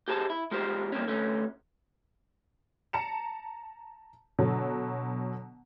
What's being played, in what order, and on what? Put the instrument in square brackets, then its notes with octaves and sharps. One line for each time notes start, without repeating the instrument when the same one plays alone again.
[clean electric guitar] G4 G#4 C5 G#5 A5
E4
G#3 F4 G4 C5
G2 A#3 C4 C#4
D2 A3 C#4
[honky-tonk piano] A5 A#5 C#7 E7
B2 D3 F#3